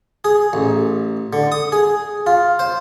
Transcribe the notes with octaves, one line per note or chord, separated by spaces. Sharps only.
G#4
A1
D3
D#6
G#4
F4
C5